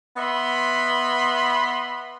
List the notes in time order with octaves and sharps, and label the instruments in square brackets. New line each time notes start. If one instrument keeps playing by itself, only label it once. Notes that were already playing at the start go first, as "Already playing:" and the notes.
[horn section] B3 D#5 E5 B5 C6